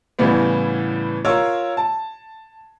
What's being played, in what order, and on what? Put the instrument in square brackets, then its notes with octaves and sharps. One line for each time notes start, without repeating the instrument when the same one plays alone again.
[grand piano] A2 C#3 E3 G3 B3
F4 A#4 C#5 E6
A5